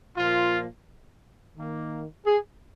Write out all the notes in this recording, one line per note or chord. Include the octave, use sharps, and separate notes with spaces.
A#2 F3 A#3 F4
D#3 A#3
G#4